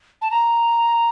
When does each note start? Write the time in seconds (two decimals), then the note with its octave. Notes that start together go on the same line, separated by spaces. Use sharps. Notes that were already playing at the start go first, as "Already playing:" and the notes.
0.22 A5
0.31 A#5